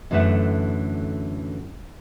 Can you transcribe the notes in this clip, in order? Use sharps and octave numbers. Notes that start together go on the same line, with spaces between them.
F#2 D3 E3 A3 E5 F#5